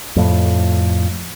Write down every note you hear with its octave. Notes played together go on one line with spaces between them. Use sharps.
F2 A2